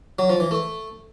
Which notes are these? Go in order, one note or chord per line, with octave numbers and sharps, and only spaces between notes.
F#3
F3
E3
A3